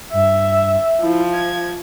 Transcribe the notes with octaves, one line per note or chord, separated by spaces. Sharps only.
G2 E5
F3 E4
G#6